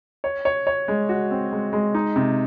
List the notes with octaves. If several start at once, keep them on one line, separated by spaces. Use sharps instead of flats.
C#5
C#5
C#5
G#3
F#4
C4
G#3
G#3
D#4
C3